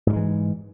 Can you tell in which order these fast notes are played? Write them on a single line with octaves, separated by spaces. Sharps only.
G#2 G3 G#3 E3